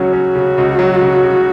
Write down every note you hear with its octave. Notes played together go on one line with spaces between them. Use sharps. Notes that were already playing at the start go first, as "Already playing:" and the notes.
Already playing: C#2 C#3 F#3 C#4 F#4
C#4
C#3
C#2
F#3
C#3
C#3